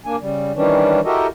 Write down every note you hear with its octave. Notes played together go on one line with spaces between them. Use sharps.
D#2 A#3 D4 G#5
C#3 G3
D#3 E3 G3 C#4 D4
E4 F#4 G4 A4 A#4 D#5